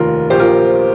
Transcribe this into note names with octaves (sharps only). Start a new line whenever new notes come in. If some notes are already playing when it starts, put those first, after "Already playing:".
Already playing: F1 D#2 D#3 F4 A#4
A#1 A#2 G4 C5
F4 A#4